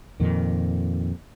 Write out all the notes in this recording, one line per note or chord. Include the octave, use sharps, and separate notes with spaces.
F2 A#2 D#3